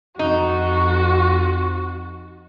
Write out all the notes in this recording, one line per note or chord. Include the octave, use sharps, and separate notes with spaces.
F2 D#4 F#4